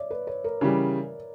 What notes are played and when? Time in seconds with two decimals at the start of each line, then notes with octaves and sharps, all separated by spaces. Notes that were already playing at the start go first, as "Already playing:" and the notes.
Already playing: C#5 D5 E5
0.11 B4
0.27 C#5
0.44 A#4
0.61 C#3 E3 G3